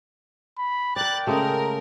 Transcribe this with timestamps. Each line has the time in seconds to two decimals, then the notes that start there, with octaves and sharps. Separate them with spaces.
0.58 B5
0.96 A#4 D5 G5 F#6 A6
1.27 C#3 G#3 A3 A#4